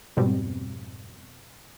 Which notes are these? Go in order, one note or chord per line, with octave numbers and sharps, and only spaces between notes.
F2 G#2 B2 G3 C4